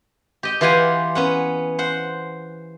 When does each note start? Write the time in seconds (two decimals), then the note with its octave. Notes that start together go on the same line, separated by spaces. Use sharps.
0.43 G4 D#5 G5
0.61 E3 F4 G4 F5 F#5 G#5
1.15 B3 C#4 F#5
1.79 C5 F#5